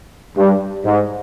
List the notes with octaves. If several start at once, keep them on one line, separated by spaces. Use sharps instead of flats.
G2
G#2